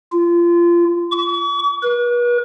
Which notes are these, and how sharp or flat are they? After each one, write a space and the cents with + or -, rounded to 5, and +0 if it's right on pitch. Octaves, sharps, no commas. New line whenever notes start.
F4 -25
C#6 +45
B4 -40